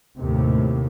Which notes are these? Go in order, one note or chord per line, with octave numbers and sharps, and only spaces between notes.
D#2 A2 C3